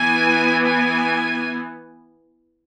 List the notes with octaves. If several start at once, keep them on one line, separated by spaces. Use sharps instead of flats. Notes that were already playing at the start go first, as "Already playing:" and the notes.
Already playing: E3 B3 G#5
G#5